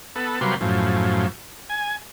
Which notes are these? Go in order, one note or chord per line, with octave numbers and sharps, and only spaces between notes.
B3 A4
C3 F#3 G3 A#3 B4 C6
F#2 A2 F3
G#5